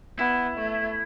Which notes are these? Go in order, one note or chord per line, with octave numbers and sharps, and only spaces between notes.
B3 E4
A3